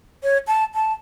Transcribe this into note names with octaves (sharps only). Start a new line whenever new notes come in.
C#5
A5
A5